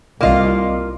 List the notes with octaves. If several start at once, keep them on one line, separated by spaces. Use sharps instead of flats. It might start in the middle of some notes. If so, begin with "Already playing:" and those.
C2 A#3 F4 D5 D#5 F5